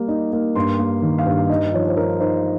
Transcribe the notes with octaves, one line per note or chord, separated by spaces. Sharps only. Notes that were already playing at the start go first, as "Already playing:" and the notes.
Already playing: G3 A#3
D#4
A#3
G2 C6
A#3
D#3
F5
G2
D#4 D#5
F3 C#5
C5
D#4 A#4
D#4 C5